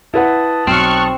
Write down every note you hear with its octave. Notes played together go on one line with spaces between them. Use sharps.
E4 B4 F#5 A5 D#6 A6
B1 C4 C#6 F6 F#6